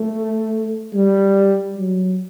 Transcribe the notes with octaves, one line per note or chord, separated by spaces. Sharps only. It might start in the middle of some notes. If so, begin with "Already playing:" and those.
Already playing: A3
G3
F#3